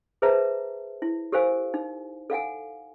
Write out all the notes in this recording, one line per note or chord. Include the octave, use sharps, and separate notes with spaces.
G#4 B4 C5 E5 A5 A#5
E4
G4 A4 A#4 C5 F5 G#5
D#4
A4 F5 F#5 G#5